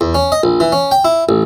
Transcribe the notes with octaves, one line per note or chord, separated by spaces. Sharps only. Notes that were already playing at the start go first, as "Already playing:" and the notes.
E2
C#4
D#5
A#1
E3
C#4
G5
E4
A1